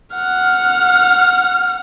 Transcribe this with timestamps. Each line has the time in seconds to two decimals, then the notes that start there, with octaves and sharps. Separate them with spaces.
0.13 F#5 F6